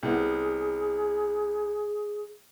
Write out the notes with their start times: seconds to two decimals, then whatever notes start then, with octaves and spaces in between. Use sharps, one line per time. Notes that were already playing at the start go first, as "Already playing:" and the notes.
0.03 C2 B3 G#4